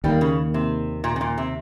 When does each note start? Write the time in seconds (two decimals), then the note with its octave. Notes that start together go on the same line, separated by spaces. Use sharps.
0.04 D#2 D#3 G3 A#3
0.21 C#3
0.54 C3
1.04 A#2
1.16 C3
1.21 A#2
1.38 C3